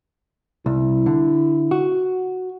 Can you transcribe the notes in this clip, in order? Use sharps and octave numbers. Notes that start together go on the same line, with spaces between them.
C2 E4
D3
F#4